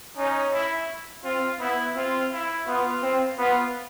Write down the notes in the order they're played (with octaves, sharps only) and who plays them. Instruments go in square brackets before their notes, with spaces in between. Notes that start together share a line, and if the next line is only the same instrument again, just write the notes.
[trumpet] C#4 [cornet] D#4
[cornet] E4
[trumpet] C4 [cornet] F4
[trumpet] B3 [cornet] E4
[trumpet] C4 [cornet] F4
[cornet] E4
[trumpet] B3 [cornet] F4
[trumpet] C4
[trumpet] B3 [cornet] F4